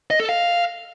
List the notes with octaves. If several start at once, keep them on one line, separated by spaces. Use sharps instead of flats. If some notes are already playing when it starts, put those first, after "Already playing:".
D#5
A4
F5